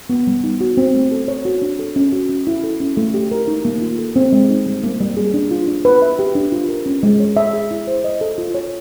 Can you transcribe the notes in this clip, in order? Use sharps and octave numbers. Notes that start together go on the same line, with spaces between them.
B3
G3
D#4
F#4
C4
A3
A4
C#5
F#4
D4
A4
C#4
F#4
C#4
E4
A4
C#4
A3
G4
A#4
D#4
A#3
F4
A4
C4
G#3
D#4
G3
A#3
G3
G#4
D4
F4
D4
B4
E5
G4
D4
F4
A#4
C#4
G#3
C#5
E5
G#4
E4
C5
D#5
A4
F4
C#5